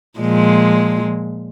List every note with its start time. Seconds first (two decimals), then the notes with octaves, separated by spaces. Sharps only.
0.18 A#2 F3 G#3